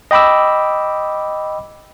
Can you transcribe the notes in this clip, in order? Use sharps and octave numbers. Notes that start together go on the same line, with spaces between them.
D#5 G5 B5 D6 E6